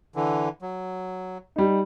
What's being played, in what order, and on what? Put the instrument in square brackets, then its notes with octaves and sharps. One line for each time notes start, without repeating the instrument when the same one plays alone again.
[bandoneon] D3 E3
F#3
[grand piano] G3 D#4